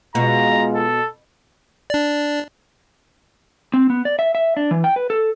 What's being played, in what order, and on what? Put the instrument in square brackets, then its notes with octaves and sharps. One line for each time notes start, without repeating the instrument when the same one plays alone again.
[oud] B2 [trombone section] G#3 F4 [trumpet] A#5
[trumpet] A4
[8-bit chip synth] D4 D5
[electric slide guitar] C4
B3
D5
E5
E5
D4
E3
G5
B4
A4